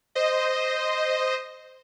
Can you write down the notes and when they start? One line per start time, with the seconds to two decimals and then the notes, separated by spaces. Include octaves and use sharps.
0.15 C5 D#5